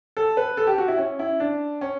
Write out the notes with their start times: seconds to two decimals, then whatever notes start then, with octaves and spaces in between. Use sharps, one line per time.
0.17 A4
0.37 B4
0.57 A4
0.67 G4
0.78 F#4
0.88 E4
0.98 C#4
1.19 E4
1.40 D4
1.81 C#4